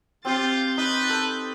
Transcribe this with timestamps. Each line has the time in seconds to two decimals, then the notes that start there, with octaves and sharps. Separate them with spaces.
0.25 C4 F4 G4 G6 A6
0.77 D#4 B4
1.10 A4